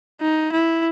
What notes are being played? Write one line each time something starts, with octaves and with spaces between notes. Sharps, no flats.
D#4
E4